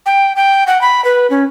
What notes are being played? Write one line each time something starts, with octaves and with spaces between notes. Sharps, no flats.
G5
G5
F#5
B5
B4
C#4